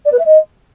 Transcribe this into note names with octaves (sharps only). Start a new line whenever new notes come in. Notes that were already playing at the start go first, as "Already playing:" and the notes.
D5
B4
E5
D#5